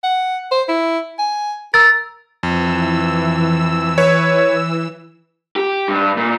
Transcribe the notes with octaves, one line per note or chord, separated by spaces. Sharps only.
F#5
C5
E4
G#5
A#4 E6 A6
F2 E3 E6
B4 C#5
G4
G2
A#2